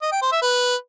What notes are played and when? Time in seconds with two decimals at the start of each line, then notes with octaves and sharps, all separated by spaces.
0.02 D#5
0.12 G5
0.22 C5
0.32 E5
0.42 B4